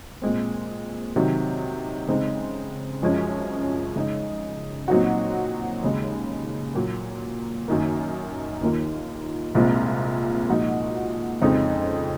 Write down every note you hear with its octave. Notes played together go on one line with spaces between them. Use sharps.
A#2 G#3 C4
C3 D#3 F#3
C#3 G#3 C4 D#4
F#2 F3 G#3 C#4
C#3 G#3 D#4
A#2 F#3 C4 D#4 F#4
D#2 C#3 G#3
A#2 F#3 A#3
F#2 D#3 A#3
D#2 D#3 A#3 F4
C2 A#2 G#3 C4 F4
A#2 F3 G#3 D#4 F#4
F2 C#3 G#3 C4 D#4